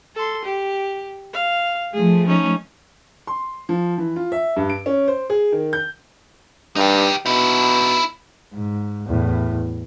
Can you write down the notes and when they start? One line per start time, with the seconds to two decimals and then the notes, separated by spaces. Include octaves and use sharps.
0.15 A4 C6
0.45 G4
1.33 F5
1.93 F3 A3 G#4
2.27 C#4 D#4
3.27 C6
3.69 F3
3.98 E3
4.16 F4
4.32 E5
4.57 G2
4.69 D7
4.86 C#4
5.08 C5
5.30 G#4
5.52 D#3
5.73 G6
6.76 G2 D#4 G4
7.26 B2 D#4 E4
8.54 G#2
9.06 E2 A2